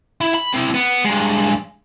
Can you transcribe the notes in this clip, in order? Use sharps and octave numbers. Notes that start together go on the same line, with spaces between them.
E4
B5
C4 E4
B3
G2 G#3